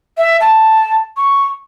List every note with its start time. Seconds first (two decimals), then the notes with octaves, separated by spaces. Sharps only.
0.17 E5
0.40 A5
1.17 C#6